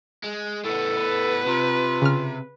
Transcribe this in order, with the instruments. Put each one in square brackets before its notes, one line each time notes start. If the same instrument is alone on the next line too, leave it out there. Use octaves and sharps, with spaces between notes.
[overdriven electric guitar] G#3
[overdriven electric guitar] A2 B3 [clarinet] A4
[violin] B4
[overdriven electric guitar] C3 [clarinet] F4
[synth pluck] C#3 F6